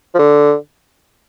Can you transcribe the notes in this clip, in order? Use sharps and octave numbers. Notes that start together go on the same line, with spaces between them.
F3
D3